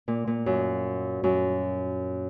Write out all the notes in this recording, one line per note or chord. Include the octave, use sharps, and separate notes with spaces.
A#2
A#2
F#2
F#2